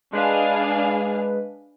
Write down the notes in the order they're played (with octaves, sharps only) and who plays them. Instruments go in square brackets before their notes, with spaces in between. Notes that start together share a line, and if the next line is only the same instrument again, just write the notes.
[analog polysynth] G#3 B4 [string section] D4 G#4 F5